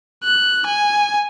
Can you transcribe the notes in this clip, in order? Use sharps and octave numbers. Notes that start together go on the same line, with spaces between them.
F#6
G#5